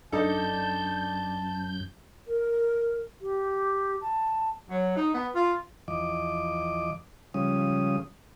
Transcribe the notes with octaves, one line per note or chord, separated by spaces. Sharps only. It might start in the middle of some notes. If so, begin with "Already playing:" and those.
F#2 D4 D#4 A4 A5 G6
A#4
G4
A5
F#3
D#4
B3
F4
E2 F3 D#5 D6
C#3 F3 G3 G#3 C#4 D#6